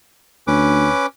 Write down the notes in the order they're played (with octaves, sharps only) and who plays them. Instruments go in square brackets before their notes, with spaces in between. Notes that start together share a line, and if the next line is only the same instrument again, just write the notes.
[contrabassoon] D2 [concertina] C#4 B4 D6